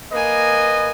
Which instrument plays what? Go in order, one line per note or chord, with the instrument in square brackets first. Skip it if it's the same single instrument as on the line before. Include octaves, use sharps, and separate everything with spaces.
[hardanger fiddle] A#3 G#5 [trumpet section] B4 D#5